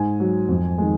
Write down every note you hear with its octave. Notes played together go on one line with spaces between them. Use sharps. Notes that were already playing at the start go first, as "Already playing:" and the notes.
Already playing: G#2 G#5
F#3
F2
D#3 G#3